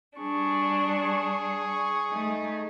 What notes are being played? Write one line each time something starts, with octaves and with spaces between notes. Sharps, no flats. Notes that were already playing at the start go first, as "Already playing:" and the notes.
G3 D4 G#4 C#6
C#6
A3 D#4